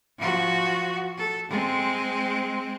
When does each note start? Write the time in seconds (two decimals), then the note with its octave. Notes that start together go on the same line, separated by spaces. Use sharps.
0.18 F3 F#4
1.18 A4
1.50 G#3 C4